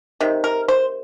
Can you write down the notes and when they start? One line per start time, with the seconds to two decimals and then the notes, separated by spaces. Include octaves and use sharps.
0.21 C3 D#3
0.44 A#4
0.68 C5